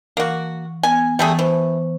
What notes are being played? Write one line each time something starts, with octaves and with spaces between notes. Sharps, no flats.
E3 A#3 F#4
B3 G#5
E3 G3 A3 G#4
E3 C5 C#6